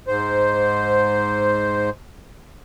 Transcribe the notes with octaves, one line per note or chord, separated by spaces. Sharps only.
G#2 C5